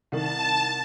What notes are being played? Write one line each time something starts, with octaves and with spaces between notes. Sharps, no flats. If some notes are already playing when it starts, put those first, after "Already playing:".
C2 D#3 A5